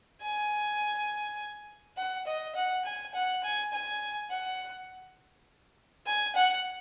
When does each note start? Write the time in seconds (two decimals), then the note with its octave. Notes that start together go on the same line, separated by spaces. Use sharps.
0.22 G#5
1.97 F#5
2.27 D#5
2.55 F#5
2.85 G#5
3.14 F#5
3.43 G#5
3.73 G#5
4.31 F#5
6.06 G#5
6.36 F#5